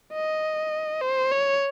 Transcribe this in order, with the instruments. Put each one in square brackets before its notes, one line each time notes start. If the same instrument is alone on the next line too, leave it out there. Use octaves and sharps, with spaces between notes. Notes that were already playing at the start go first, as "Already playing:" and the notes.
[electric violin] D#5
C5
C#5